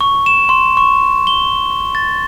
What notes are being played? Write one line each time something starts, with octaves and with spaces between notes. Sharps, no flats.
C#6
E7
C6
C#6
G7
A6